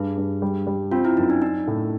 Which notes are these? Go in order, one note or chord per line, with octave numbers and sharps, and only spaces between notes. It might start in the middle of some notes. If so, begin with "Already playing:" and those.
Already playing: G2 G#4
G2
G3
G3
C4 F4
E4
F#2 D#4
D4
D4 D#4
A2